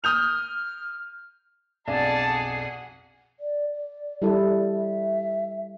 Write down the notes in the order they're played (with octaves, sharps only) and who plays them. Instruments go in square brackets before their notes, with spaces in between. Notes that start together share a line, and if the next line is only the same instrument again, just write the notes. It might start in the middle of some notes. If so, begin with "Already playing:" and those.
[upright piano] D#6 G6 F7 [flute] F6
[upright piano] B1 F2 D4 [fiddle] G#4 F#5 [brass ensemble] D5 A5
[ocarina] D5
D5
[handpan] G3 E4 A4
[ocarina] E5